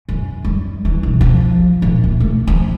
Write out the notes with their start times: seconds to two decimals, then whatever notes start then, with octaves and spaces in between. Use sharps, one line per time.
0.09 F#2
0.45 G3
0.85 E3
1.03 B1
1.21 F3
1.82 A#1
2.04 A#2
2.20 A3
2.47 F3